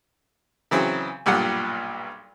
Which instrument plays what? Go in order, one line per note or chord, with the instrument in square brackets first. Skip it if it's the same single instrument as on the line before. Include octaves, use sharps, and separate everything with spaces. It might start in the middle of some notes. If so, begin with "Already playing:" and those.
[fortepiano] C#3 E3 F#3 C4
B1 G2 A#2 G4 F#5